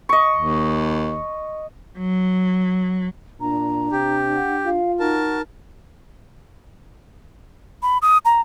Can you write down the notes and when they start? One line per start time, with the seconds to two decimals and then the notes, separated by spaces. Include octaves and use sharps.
0.09 D#5 C#6
0.36 D#2
1.98 F#3
3.40 A#2 D4 A#5
3.92 C3 G4
4.35 F#5
4.65 F4 F5
5.00 D#4 F#4 A#4 A5
7.83 B5
8.02 D#6
8.25 A#5